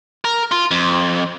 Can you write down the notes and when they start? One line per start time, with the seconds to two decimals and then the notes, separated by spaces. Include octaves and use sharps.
0.25 A#4
0.51 F4
0.71 F2